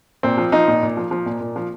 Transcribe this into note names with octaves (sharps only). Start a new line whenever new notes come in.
A#2 C4
F3
F3 D#4
A#2
A#2
F3
F3
A#2
A#2
F3